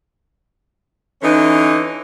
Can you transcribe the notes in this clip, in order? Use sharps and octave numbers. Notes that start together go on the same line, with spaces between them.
D3 E3 C#4 D#4